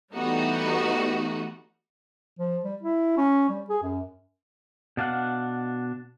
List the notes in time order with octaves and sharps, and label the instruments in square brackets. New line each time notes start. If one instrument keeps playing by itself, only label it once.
[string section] E3 G3 A3 B3 D#4 F#4
[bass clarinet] F3
G3
E4
C#4
G3
G#4
F#2
[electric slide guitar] B2 D4 F5 F#5